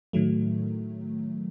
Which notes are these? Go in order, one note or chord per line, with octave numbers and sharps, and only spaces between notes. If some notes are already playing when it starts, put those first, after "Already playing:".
A2 D#3 F#3 A3